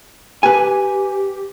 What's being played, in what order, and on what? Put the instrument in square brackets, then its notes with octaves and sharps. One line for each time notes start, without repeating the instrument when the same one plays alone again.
[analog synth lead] G4 [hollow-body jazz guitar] B4 G#5